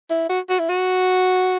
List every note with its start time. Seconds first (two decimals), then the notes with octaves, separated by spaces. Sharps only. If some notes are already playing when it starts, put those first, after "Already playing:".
0.10 E4
0.29 F#4
0.50 F#4
0.59 E4
0.69 F#4